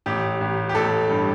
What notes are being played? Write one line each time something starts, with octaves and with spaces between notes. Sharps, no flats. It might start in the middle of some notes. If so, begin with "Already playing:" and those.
A1 G4
A1
G4
A1 A4
G2